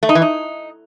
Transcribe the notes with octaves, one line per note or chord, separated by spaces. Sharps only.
A3
D#4
E3
D#4